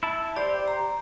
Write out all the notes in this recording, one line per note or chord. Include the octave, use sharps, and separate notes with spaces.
E4 A5
G4 C5 D5
A#5